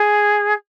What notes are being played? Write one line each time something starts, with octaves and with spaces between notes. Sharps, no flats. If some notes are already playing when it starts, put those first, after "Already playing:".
Already playing: G#4